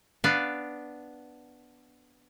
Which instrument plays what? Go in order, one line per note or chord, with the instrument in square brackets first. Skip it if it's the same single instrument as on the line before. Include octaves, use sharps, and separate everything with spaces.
[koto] B3 D4 B4 F5